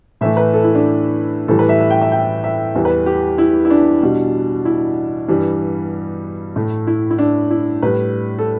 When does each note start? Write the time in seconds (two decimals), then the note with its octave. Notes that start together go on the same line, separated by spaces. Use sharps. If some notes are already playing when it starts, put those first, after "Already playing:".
0.21 A2 E3 A3 E5
0.37 B4
0.54 A4
0.64 E4
0.75 D4
1.48 A2 E3 G3 A4
1.59 B4
1.69 E5
1.80 E5
1.90 G5
2.02 E5
2.12 G5
2.44 E5
2.75 E2 E3 G3
2.85 B4
3.06 G4
3.38 E4
3.65 E4
3.70 D4
4.02 B2 G3
4.65 E4
5.28 G2 E3 G3
6.56 A2 A3
6.87 E4
7.11 E4
7.18 D4
7.51 E4
7.82 A2 G3 B4
8.38 A4